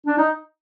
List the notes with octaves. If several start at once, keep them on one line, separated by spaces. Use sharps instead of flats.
D4
D#4